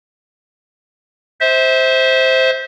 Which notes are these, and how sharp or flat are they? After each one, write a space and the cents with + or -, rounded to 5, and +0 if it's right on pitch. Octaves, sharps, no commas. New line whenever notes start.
C5 +0 E5 -30